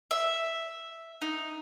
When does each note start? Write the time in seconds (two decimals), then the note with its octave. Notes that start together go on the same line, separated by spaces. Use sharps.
0.11 E5
1.22 D#4